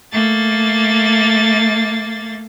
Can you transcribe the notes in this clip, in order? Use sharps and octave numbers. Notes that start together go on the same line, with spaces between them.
A3 A#3 A6